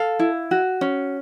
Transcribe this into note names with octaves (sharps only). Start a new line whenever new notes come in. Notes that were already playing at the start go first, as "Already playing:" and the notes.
Already playing: A4 F5
E4
F#4
C#4